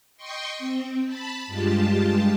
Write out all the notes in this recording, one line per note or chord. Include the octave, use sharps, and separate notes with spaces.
D#5 G5 C6 C#6
C4
A5 B5
G2 G#3 F4 G4 A5